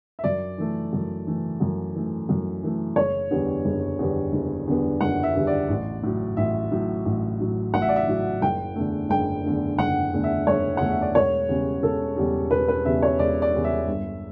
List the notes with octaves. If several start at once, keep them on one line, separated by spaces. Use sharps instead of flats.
E5
F#2 D5
E3 A3
F#2
E3 A3
F#2
E3 A3
F#2
E3 A3
F#1 C#5
E2 D3 G3 B3
F#1
E2 D3 G3 B3
F#1
E2 D3 G3 B3
F#1 F#5
E5
E2 D3 G3 B3
D5
A1
A2 F#3
A1 E5
A2 F#3
A1
A2 F#3
A1 F#5
E5
D5
E5
A2 F#3
F#1 G5
E2 D3 A3
F#1 G5
E2 D3 A3
F#1 F#5
E2 D3 A3
E5
F#1 C#5
E2 D3 A3 F#5
E5
D5
E1 C#5
E2 C#3 G3
E1 A4
E2 C#3 G3
E1 B4
B4
E2 C#3 G3 E5
C#5
E1 D5
D5
E2 C#3 G3
E5
G1